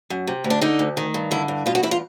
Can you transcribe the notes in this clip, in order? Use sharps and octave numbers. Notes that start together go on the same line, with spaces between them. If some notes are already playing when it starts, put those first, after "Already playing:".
F#2
C3
D2
D4
D3 D#4
D2
D#3
G2
D3 E4
G2
B2 F4
F#4
E2 E4
F4